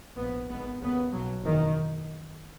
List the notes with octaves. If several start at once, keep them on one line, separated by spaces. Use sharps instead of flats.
A#1 G#2 B3
G#1 G#2 B3
D#2 C#3 B3
B1 B2 F#3
F#1 E2 B2 D#3